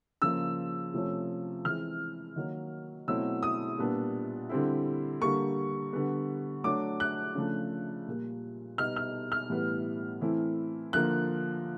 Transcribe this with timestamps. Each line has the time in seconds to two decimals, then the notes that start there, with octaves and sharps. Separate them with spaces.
0.22 C#3 F3 A#3 E6
0.94 C3 F3 A3 C#4
1.65 E3 G#3 C4 F6
2.36 D#3 F#3 A#3
3.08 B2 F#3 A3 C4 E4 E6
3.43 D#6
3.78 A#2 G3 B3 D4
4.49 D3 G3 C4 E4
5.21 D3 G3 A#3 C#6
5.93 D3 G3 B3
6.64 F#3 A3 D4 D6
7.00 F#6
7.35 C#3 F3 A3 D4
8.08 A#2 G3 A#3
8.78 B2 G3 B3 D#4 F6
8.96 F6
9.32 F6
9.50 A2 E3 G3 B3
10.21 E3 A3 C4 E4
10.93 D3 F3 A#3 F#6